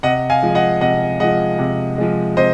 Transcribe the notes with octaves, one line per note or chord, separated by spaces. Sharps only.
C3 D#5 F#5
F5 G#5
F3 G#3
D#5 F#5
C3 D#5 F#5
F3 G#3 D#5 F#5
C3
F3 G#3
C3 C5 D#5